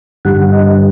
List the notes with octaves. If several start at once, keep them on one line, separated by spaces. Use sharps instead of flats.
G2 D3 G3 F#5
F#5
D#5